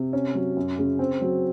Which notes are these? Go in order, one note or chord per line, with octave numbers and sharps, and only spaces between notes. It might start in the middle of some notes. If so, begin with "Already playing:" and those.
Already playing: C3
C#4
F#3
F#2
C#3
C4
F#3